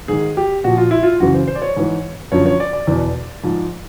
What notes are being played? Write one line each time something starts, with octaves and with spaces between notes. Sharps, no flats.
G#2 D#3 G#4
G4
A#2 F3 F#4
F4
E4
F4
F#2 C#3 E3 F#4
C5
C5
D5
C#5
G#2 E3
F#2 D3 F3 C#5
C#5
D5
D5
E2 B2
G#2 F3